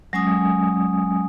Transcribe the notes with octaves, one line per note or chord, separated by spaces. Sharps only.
F#3 G#3 C#4 G#5 D#6